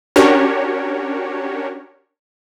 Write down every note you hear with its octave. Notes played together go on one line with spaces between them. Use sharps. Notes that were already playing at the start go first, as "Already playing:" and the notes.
C#4 D4 F#4 G4 A#4 C#5